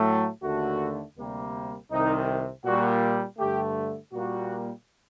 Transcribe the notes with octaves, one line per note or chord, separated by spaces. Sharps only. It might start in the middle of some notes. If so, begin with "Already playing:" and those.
Already playing: A2 F#3 A3
D#2 D3 A3 F#4
D2 C3 G3 A#3
C2 C3 D#3 D#4
A#2 G3 A#3 F#4
G2 D3 A3 G4
A#2 G3 A#3 F#4